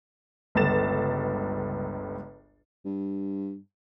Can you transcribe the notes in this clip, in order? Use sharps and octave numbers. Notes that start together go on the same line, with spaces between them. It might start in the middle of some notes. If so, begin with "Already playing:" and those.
G1 C#2 G2 A4 A6 E7
G2